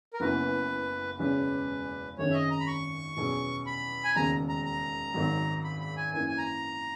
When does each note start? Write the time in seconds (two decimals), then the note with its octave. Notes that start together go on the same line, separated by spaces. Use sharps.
0.14 A#4
0.20 F#1 F#2 E3 B3 F#4 B4
1.19 E1 E2 C#3 G#3 C#4 B4
2.18 G#1 F#2 D#3 G#3 C#4 C#5
2.31 E5
2.34 D#5
2.51 A#5
2.60 B5
2.67 C#6
3.17 E2 B2 F#3 C#4 G#4
3.66 B5
4.04 G#5
4.15 E1 D#2 C#3 G#3 A#5
4.49 A#5
4.65 A#5
5.14 G#1 G#2 D#3 F#3
5.64 B5
5.80 B5
5.97 G#5
6.14 F#2 E3 A#3 G#5
6.29 G#5
6.38 A#5